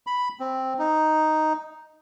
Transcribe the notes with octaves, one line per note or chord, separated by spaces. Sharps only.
B5
C4
D#4